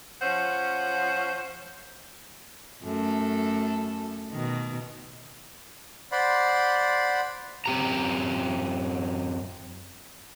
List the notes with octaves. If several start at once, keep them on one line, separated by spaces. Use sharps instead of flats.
F3 C#4 C5 F#5
F#2 A3 A4
B2 D#3
C5 D5 F#5 B5 C6
F#2 C4 G4 A#5